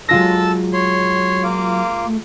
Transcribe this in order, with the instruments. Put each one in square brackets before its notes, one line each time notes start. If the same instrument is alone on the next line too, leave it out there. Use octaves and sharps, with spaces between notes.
[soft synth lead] F#3 [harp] G#3 F4 A#6 [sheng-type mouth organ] A4 A5 E6
[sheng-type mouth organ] C#5 C6
A#3 F4 D6
[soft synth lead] A3